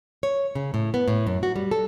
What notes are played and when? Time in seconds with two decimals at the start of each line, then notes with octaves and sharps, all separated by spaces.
0.23 C#5
0.55 C#3
0.74 A2
0.94 B3
1.08 A2
1.27 F#2
1.43 F#4
1.56 G3
1.71 A4